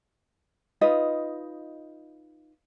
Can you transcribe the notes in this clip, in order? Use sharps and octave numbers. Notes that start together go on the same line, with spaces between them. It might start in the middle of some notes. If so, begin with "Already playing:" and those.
D#4 F4 B4 D#5